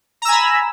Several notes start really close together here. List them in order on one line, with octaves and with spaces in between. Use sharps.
A#5 E6 G#5 B5